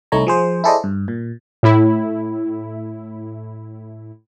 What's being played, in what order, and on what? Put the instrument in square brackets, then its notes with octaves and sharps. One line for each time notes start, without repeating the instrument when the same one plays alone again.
[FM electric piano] C2 A3 D#4 C#5 A#5
F3 G#4 C5
E4 G#4 A4 C5 D5 D#5
G2
A#2
[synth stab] A2 E4